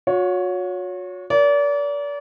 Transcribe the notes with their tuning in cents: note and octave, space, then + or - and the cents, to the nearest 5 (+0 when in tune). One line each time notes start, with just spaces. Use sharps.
F#4 -40 C#5 +15
A#4 +10 D5 -35